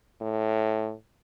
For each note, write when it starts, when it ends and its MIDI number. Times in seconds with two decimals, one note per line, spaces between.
0.22 0.94 45